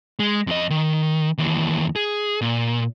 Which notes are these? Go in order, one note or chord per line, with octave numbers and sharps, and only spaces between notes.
G#3
F2 D#5
D#3
D#2 E3
G#4
A#2